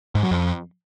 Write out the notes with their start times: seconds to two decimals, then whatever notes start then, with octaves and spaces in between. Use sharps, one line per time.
0.15 G#2
0.23 F#3
0.31 F2